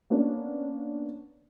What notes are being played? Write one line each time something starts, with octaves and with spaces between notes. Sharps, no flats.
A#3 B3 C#4 D4